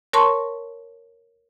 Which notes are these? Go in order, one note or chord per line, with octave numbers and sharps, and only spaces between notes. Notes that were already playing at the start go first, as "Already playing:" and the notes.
A#4 C#5 A5 C6 C#6